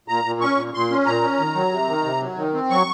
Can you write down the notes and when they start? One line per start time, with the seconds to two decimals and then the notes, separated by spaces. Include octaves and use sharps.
0.08 A#2 A#5
0.24 A#2
0.41 C#4 C#6
0.57 A#2
0.74 A#2 C6
0.90 C#4
1.06 A#2 A#5
1.22 C#4
1.39 D#3
1.55 F#3
1.72 C3
1.89 D#3
2.04 C3
2.21 F#3
2.37 D#3
2.54 C4
2.70 F#3 C#6